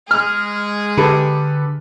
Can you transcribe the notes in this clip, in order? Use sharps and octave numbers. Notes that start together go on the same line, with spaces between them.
G#3 G#4 F6
D3 G4 A4 B4